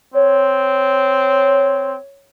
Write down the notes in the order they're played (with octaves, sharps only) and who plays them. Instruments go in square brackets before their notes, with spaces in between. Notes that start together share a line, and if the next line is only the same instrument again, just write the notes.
[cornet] C4 [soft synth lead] C#5